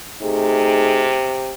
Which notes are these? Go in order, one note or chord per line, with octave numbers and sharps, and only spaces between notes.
C3 A3 D#4 G#4